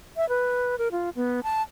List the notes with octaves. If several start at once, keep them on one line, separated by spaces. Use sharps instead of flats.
E5
B4
A#4
F4
B3
A5